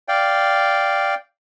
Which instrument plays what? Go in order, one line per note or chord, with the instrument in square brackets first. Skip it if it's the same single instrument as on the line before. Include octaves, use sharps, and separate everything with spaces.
[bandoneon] D5 F5 G5